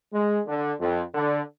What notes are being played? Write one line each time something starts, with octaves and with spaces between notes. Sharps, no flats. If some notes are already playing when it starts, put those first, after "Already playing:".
G#3
D3
F2
D3